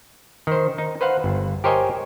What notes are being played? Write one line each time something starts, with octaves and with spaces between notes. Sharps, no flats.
D#3 C5
D#4
B4 C5 F5 F#5
G1
G4 A#4 C5 C#5 D#5 G#5